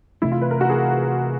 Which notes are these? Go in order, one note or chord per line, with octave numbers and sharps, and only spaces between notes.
C3 E3 A3 C4 E4
F4
B4
A#4
F#4
G#4